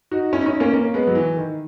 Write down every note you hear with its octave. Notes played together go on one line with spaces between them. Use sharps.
D#4 F#4
C#4 E4
D#4
C#4 E4
A#3 C#4
A#3 C#4
G#3 B3
F#3
E3
D#3